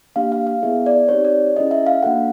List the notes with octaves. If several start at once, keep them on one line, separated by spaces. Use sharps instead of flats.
A#3 D4 G4 F5
F5
F5
B3 E4 G#4 E5
D5
C4 D#4 G4 C#5
D5
C#4 E4 G#4 D#5
E5
F5
A#3 D4 F#4 A4 F#5